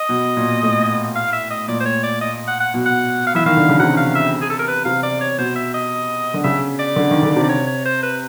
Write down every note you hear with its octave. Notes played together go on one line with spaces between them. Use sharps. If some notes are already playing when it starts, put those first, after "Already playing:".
Already playing: D#5
B2
A#2
A2
F5
E5
D#5
A#2 D5
C5
C#5
D5
D#5
F#5
F#5
B2
F#5
F5
E3 E5
D#3 F5
D3
C#3
C3 F#5
F5
E5
G#4
A4
A#4
B4
C3 F5
D5
C#5
B2 C5
E5
D#5
D3
C#3 E5
D5
D3
D#3
D3
C3
D5
C#5
C#5
C5
B4